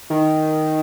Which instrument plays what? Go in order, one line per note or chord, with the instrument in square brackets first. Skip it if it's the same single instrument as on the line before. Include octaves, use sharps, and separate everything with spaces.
[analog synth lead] D#3